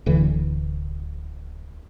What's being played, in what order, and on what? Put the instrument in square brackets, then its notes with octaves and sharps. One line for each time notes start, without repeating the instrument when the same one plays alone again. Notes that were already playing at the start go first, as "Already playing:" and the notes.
[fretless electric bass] D1 D3 E3